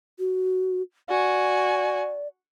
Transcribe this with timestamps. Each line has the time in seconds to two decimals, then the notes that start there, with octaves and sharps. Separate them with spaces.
0.19 F#4
1.09 F#4 D5 G#5